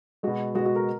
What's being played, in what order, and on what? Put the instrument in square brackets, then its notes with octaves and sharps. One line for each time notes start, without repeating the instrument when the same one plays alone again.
[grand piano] B2 G#3 F#4
G#3 F#4
B2
F#4
A#4